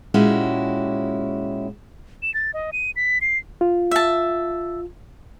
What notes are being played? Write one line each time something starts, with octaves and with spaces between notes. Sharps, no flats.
A#2 G#3 C#4 E4 F#4 G4
E7
A6
D#5
D#7
B6
C7
F4
E5 A5